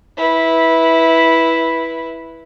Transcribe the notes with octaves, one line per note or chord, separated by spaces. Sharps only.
E4 B4